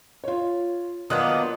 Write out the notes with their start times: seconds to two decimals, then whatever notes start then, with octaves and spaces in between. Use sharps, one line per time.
0.24 F4 C#5
1.10 D#3 F#3 A#3 B3 D4 F4 D#6 F#6